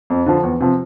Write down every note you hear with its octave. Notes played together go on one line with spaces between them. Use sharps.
F2
D3 F3
E2
C3 F3